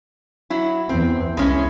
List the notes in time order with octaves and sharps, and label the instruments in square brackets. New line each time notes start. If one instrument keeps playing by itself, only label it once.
[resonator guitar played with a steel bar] F#3 E4
[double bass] E2 [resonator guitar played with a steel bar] C4
[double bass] C2 [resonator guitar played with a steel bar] G#3 C#4 E4